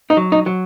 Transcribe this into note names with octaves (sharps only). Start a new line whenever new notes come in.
D#4
F#3
D#4
F#3